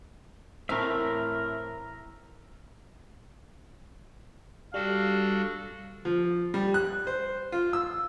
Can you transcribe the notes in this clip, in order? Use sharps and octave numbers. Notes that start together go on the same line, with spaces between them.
A2 E3 A3 C4 A#4 E5 F5
G3 D4 F#4 A4 F5
F3
G3
F#6
C5
F4
E6